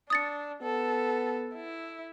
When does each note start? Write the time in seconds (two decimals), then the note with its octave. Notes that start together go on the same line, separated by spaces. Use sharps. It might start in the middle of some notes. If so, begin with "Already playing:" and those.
0.10 D4 D#6 A6 C#7
0.63 B3 A4
1.55 E4